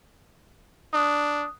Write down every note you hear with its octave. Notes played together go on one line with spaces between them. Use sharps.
D4 D#6 F#6